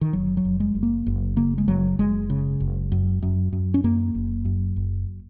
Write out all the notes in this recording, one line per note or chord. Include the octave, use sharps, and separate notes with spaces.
D#3
F#1 F#3
F#3
F#1
G#3
F#1
A#3
F#1
C#3 A#3
G#3
F#1 F#3
F#1 G#3
C#3
F#1
F#2
F#2
F#2
C#4
F#2 A#3
F#1
F#2
F#1